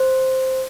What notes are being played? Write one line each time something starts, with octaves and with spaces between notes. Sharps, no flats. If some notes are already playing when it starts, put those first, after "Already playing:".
Already playing: C5